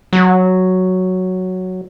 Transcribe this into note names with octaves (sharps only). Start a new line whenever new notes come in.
F#3